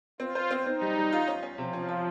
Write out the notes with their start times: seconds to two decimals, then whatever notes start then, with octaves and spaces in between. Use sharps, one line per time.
0.20 C4 F4
0.35 C5
0.51 C4
0.66 C4 D#4
0.81 G3
0.97 G3
1.12 F4
1.27 C#4
1.43 C#4
1.58 C3 F3
1.73 C#4
1.89 F4